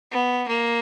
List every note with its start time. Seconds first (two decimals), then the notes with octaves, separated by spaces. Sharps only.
0.11 B3
0.48 A#3